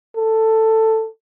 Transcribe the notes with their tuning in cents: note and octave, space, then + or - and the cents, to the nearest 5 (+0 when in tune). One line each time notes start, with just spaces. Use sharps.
A4 +10